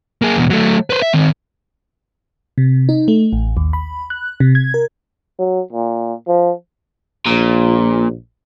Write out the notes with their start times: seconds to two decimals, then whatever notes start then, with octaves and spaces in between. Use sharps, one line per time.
0.22 A#3 G#4
0.37 E2 B2
0.50 F#3 A3
0.90 B4 C5
1.02 E5
1.14 D#3 C4
2.58 C3
2.89 D#4
3.08 A3
3.33 A1
3.57 D#2
3.73 B5
4.10 F#6
4.40 C3
4.55 G#6
4.74 A#4
5.39 F#3
5.72 A#2
6.28 F3
7.26 A#1 A#2